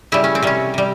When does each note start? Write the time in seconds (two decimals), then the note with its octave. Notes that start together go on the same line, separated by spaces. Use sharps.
0.12 C#3 G3 E4
0.24 C#4
0.35 C4
0.42 C3 G3 C#4
0.74 C3 G3